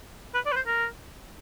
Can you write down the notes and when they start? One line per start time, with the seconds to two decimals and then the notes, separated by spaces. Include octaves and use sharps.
0.34 B4
0.46 D5
0.52 B4
0.56 C5
0.67 A#4